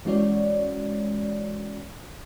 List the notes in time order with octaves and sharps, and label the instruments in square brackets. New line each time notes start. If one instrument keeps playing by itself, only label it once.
[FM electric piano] E3 G#3 C#4 F#4 C#5 D5